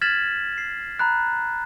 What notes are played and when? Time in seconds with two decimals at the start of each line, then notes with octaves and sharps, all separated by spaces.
0.01 F6 G#6 A6 B6 E7 F#7
0.58 C7
0.99 A#5 B5 F#6